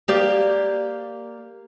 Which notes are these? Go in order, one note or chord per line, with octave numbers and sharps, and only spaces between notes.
A#3 G4 D5